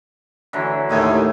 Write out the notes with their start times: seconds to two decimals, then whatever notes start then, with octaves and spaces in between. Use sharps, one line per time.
0.53 D3 E3 F#3
0.89 D#2 A2 A3 D#5 G#5